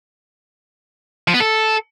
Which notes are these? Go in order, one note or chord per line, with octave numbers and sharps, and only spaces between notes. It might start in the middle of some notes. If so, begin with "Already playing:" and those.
F3
B3
A4